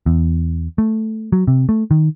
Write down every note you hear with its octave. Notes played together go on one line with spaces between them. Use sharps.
E2
A3
F#3
C3
A3
D#3